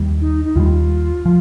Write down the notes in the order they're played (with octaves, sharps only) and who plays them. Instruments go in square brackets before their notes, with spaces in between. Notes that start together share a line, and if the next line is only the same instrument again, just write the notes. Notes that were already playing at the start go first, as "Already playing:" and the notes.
Already playing: [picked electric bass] D#2 D#3 G3
[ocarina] D#4
D#4
[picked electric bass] D#2 D#3 G3 [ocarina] F4
[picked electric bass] F3